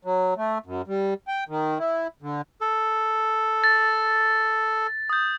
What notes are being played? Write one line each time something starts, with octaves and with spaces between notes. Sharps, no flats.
F#3
A3
F#2
G3
G5
D#3
E4
D3
A4
A6
D#6 G6